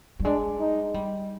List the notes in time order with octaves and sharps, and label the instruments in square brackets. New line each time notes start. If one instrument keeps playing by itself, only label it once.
[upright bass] G3
[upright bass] G#3 [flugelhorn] D4
[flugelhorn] D#4
[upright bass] G3